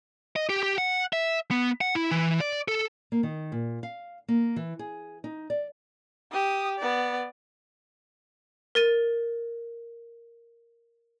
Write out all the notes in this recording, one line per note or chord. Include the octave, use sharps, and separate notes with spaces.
D#5
G4
G4
F#5
E5
B3
F#5
E4
E3
D5
A4
A#3
D#3
A#2
F5
A#3
E3
G#4
D#4
D5
G4 D#6
B3 D5
A#4 A6 D#7